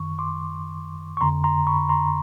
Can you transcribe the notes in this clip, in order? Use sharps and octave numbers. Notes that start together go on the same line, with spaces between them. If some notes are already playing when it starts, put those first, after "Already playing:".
Already playing: F#2 D#3 C#6
C6 D6
C#6
F2 D3 A#5 C6
A#5 C6
B5 C#6
A#5 C6